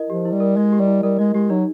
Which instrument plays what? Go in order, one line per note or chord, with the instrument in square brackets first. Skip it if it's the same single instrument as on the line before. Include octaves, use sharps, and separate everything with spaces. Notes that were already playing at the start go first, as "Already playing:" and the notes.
Already playing: [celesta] E4 A#4 D#5
[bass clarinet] F3 [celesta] G4
[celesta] E4
[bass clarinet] G3
[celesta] A#4
[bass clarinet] G#3 [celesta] D#5
[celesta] G4
[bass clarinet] G3
[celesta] E4
[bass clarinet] G3 [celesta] A#4
[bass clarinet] G#3 [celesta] D#5
[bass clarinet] G#3 [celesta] G4
[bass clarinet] F#3 [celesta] D#4